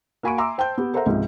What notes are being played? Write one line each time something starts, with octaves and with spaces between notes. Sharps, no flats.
A#3 F#4 G#5 B5 C#6 D7
E5 G#5 A#5 C6 D6 E6
C5 G5 A5 C6 G6
B3 G4
A4 A#4 C5 E5 F#5 A#5
C#2 G#2 C3 F3